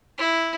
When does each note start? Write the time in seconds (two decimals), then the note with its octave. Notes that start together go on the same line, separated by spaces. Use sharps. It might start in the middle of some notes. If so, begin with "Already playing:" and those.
0.18 E4